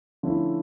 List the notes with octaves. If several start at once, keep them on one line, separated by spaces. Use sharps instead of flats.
D3 F3 A3 C#4 E4